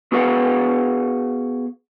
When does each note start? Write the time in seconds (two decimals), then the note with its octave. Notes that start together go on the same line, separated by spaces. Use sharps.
0.12 B3 F#4 G#4 B4 F5 F#5